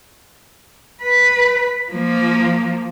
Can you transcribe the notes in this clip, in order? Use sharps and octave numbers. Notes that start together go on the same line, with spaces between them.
B4
F3 A#3